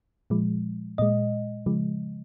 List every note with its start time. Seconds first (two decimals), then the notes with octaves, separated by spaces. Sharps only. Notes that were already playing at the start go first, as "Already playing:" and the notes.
0.30 A#2 F3 G#3
0.98 A#2 G#3 D#5
1.66 C#3 F3 G#3